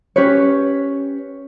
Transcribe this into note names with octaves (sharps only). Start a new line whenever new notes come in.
C#4 G4 B4 C#5